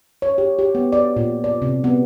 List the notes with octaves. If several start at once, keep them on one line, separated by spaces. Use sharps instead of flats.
C#5
G4
G4
B3
D5
A#2
D5
C3
B3